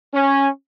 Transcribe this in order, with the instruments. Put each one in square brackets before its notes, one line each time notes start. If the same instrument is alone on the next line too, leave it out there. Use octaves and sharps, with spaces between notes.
[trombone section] C#4